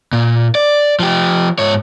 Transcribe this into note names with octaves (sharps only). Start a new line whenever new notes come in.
A#2
D5
F3 G4
G#2 C#5